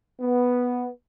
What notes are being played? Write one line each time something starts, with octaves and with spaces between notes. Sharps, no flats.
B3